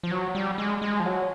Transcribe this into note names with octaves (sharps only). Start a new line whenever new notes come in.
F3
F#3
G3
G#3
G#3
F3
F#3